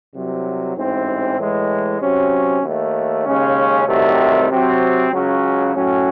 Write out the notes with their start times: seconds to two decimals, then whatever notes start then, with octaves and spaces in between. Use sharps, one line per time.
0.13 C2 C3 F#3
0.76 A1 G#2 E3 C4
1.38 A2 E3 G#3
2.00 C3 F#3 C#4
2.63 D#2 D#3 A3
3.25 D#2 C#3 G#3 C#4
3.87 C2 C3 D#3 F#3 A3
4.50 C3 F#3 C4
5.12 C#2 C#3 F#3 C#4 F#4
5.75 A2 F#3 C#4